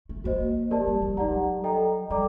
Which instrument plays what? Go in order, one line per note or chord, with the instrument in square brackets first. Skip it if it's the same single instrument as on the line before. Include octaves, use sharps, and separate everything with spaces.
[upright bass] A3
[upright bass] A#3 [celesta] F#4 C5 D#5
[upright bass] A#3 [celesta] G4 A#4 D5 A5
[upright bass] G3
G3
[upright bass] F#3 [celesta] D#4 G4 D5 F#5 A#5
[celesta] A4 D#5 G5 A#5
[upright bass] G3 [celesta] A4 D5 G5 A#5 D6